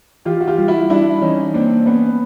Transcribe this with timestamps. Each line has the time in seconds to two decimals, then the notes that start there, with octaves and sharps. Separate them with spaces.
0.25 E3 F4 G4
0.41 F#4
0.48 F4 G4
0.58 G3
0.68 E4 F#4
0.90 G3 D4 E4
1.22 E3 C#4 D#4
1.54 A#3 C4 D4
1.86 A#3 B3 C#4